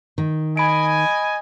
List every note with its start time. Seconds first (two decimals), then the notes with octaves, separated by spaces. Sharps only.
0.18 D#3
0.57 D#5 G#5 B5 D7